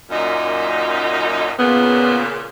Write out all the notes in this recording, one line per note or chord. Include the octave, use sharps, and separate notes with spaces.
F#2 A#2 D#4
A#2 C#3 B3